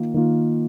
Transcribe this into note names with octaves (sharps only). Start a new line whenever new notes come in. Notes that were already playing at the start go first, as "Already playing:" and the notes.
Already playing: D#3 A#3 F4
D#3 A#3 F4